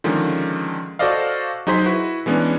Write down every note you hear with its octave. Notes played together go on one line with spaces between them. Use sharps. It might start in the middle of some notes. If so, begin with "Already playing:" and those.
D3 D#3 F3 G#3 C#4
F#4 A4 C5 D5 D#5 F5
F#3 D#4 G#4 C5 C6 B6
E4 F#4 B4
E3 G#3 B3 C#4 D4